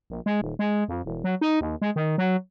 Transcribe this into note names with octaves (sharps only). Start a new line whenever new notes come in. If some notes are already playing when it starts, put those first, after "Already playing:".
A#1
G#3
D#1
G#3
F2
E1
F#3
D#4
D#2
G#3
D#3
F#3